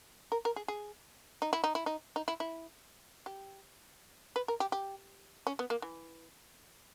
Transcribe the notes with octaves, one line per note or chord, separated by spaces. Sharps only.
A#4
A#4
G#4
G#4
D#4
E4
D#4
E4
D#4
D#4
E4
E4
G4
B4
A#4
G4
G4
C#4
B3
A#3
E3